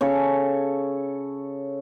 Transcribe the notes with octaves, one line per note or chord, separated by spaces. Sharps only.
C#3 A4 C#5